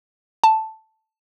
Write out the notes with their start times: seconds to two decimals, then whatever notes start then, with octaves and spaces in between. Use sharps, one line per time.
0.44 A5